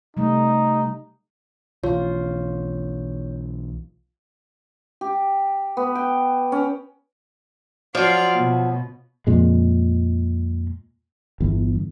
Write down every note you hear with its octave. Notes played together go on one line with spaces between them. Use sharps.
C3 G3 A3 D#4
B1 E3 F4 C#5
G4
B3
G5
C#4
F3 F#3 F4 D5 F5
B2
F2 A#2 G#3
G1 E2